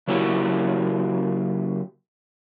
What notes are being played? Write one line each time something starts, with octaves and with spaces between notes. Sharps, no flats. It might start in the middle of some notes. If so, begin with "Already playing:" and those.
C#3 F#3 A#3 E4 F#4 G4